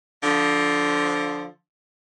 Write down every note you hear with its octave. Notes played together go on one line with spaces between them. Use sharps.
D3 F3